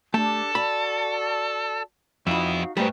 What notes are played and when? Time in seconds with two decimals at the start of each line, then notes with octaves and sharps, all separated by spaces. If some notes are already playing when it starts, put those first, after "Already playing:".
0.14 A3 D4 G4 A4 A5
0.55 F#4 D5 A5 B5
2.27 F2 B3 D#4 F#4 E5 F5 B5
2.77 G#2 G3 A3 B4 C5